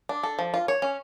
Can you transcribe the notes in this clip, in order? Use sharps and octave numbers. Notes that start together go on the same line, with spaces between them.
D4
A4
F3
F4
C#5
C#4